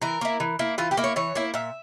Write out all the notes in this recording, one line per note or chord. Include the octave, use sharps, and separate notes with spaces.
E3 A#4
A#3 E4
E3
A#3 E4
E3 F4
G4
A#3 E4
C#5
E3 C#5
A#3 E4
A#2 E5